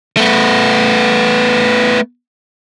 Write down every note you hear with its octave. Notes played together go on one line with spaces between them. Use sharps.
A3 B3